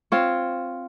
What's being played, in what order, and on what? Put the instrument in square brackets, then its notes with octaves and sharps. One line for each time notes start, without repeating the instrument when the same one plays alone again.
[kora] C4 F4 C#5